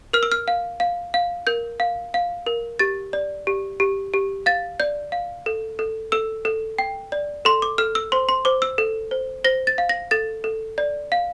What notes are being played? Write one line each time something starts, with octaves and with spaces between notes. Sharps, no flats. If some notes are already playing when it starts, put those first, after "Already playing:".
A#4 F6
E6
F6
F5
F5
F5
A#4 G6
F5
F5
A#4
G4 A6
D5
G4
G4
G4
F5 A6
D5 G6
F5
A4
A4
A4 E6
A4
G5
D5
A4 C6
D6
A4 F6
E6
C5 C6
C6
C5 D6
E6
A4
C5
C5 A#6
A6
F5
A#6
A4 A6
A4
D5
F5